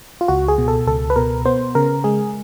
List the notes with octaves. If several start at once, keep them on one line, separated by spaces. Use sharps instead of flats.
F4
C#2 F#4
G#4
B2
A4
C#2 A4
B4
B2 A#4
B3 C5
C#3 A#4
G#3 G#4